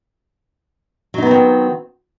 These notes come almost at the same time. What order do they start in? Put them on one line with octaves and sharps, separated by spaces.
F#3 D#4 B3 C4 D#3